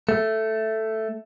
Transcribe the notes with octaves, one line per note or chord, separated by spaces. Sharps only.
A3